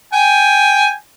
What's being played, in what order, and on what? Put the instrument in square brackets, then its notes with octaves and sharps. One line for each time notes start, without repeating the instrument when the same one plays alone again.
[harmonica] G5 G#5